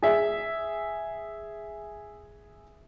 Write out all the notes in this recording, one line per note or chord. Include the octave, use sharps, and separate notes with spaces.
G#4 E5